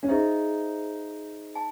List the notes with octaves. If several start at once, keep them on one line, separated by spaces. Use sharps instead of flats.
C#4
D#4 G#4 C5 E5
A5